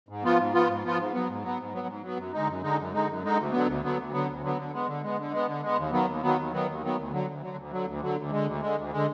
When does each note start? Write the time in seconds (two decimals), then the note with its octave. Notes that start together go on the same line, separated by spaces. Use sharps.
0.09 G#2
0.23 F3 B3 F4
0.38 G#2
0.53 F3 B3 F4
0.68 G#2
0.83 F3 B3 F4
0.98 G#2
1.13 F#3 B3
1.28 G#2
1.42 F#3 B3
1.58 G#2
1.73 F#3 B3
1.87 G#2
2.03 F#3 B3
2.17 F#2
2.33 D3 G#3 D#4
2.47 F#2
2.63 D3 G#3 D#4
2.78 F#2
2.93 D3 G#3 D#4
3.08 F#2
3.22 D3 G#3 D#4
3.38 D2
3.52 D3 F#3 B3
3.67 D2
3.82 D3 F#3 B3
3.97 D2
4.12 D3 F#3 B3
4.27 D2
4.42 D3 F#3 B3
4.57 D3
4.73 G#3 B3
4.87 D3
5.03 G#3 B3
5.17 D3
5.31 G#3 B3
5.46 D3
5.62 G#3 B3
5.76 D#2
5.92 D#3 F#3 B3
6.06 D#2
6.22 D#3 F#3 B3
6.37 D#2
6.52 D#3 F#3 B3
6.67 D#2
6.82 D#3 F#3 B3
6.97 D2
7.11 D3 F#3
7.27 D2
7.41 D3 F#3
7.57 D2
7.71 D3 F#3
7.86 D2
8.01 D3 F#3
8.16 D2
8.31 D3 G#3
8.46 D2
8.61 D3 G#3
8.76 D2
8.92 D3 G#3